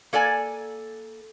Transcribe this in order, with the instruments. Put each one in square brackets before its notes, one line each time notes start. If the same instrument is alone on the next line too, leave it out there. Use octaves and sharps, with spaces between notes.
[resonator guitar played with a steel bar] A#3 A4 D5 G#5